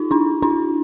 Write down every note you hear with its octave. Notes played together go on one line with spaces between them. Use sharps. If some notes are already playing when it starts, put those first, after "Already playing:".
Already playing: D#4 F4
D4 E4
D4 E4